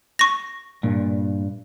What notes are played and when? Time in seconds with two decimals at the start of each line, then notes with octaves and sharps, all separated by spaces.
0.19 C#6 A#6
0.83 G2 A#2